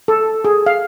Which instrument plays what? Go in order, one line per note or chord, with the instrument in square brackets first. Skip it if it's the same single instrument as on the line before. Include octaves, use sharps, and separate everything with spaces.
[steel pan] A4
G#4
F5